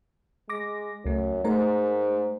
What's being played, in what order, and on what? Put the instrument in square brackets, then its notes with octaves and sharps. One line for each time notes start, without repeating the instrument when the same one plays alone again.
[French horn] G#3 [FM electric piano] D6 A#6
[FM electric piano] C#2 A3 [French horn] F#2
[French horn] G#2 [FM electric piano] A3 A#4 A#5